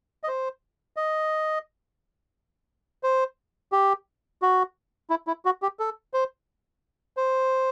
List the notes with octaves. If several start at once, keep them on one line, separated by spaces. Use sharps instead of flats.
D#5
C5
D#5
C5
G4
F#4
E4
E4
F#4
G4
A4
C5
C5